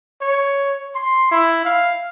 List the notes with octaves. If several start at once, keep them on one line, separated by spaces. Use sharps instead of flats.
C#5
C6
E4
F5